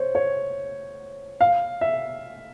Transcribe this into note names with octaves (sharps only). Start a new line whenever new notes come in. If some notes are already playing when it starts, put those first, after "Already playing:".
Already playing: C5 C#5
C#5
F5
E5